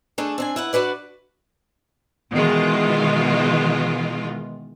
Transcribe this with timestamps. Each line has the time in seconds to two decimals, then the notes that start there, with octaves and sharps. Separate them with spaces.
0.18 A3 D4 G#4 A4
0.38 C4 D4 G#5
0.56 E4 B4 F#5
0.73 D4 F#4 B4 D5
2.32 B2 D#3 E3 G#3 F4